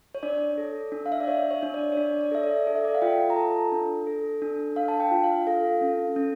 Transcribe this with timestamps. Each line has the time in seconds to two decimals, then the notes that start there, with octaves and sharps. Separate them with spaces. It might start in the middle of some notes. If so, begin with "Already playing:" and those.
0.15 C#5
0.23 D4 D5
0.58 A4
0.92 D4
1.06 F5
1.12 E5
1.20 D5
1.27 D4 C#5
1.51 C#5
1.63 D4
1.74 D5
1.92 C#5
1.97 D4 D5
2.21 D5
2.32 A4 E5
2.43 D5
2.67 A4 D5
2.76 E5
2.85 D5
2.95 F5
3.02 F4 G5
3.30 A#5
3.36 A4 A5
3.72 D4
4.07 A4
4.42 D4
4.76 D4 F5
4.88 A5
5.00 G5
5.11 F4
5.23 F5
5.47 A4 F5
5.81 C#4
6.16 C#4